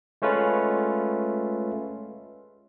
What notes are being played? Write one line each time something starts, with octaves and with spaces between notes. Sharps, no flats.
G#3 A3 C#4 F4 B4